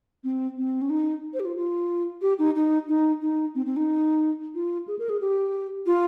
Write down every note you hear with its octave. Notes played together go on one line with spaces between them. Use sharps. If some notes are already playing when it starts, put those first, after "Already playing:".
C4
C4
C#4
D#4
C5
G4
F4
F4
G4
D#4
D#4
D#4
D#4
C4
C4
D#4
F4
G#4
A#4
G#4
G4
F4